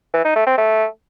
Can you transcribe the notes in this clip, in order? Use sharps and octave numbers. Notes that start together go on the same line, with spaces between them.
E3
D#4
A3
C4
A3